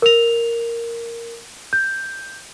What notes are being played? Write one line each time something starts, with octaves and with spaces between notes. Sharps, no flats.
A#4 F7
G6